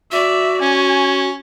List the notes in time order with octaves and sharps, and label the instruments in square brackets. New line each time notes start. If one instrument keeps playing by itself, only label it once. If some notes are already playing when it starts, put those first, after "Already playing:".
[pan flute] F#4 [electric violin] D5 E5
[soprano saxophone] C#4 [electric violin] G#5